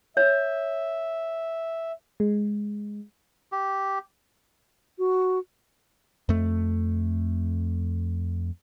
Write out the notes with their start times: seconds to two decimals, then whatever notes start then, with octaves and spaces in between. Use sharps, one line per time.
0.17 C#5 E5
2.20 G#3
3.52 G4
4.98 F#4
6.29 F2 A3